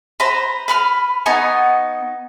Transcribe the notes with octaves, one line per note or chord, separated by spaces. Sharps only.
B4 C5 A#5 B5
B4 B5 F6
B3 D#4 G#5 C#6